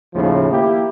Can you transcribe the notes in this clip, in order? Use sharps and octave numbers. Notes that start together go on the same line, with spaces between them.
D#2 A2 C#3 F3
A#3 E4 G4